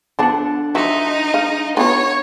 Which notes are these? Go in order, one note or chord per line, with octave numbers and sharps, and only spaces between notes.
F3 B3 D4 A4 F#5 A5
F3 F#3 D#4 E5 F#5 C6
G#3 F5
B3 F4 B4 C#5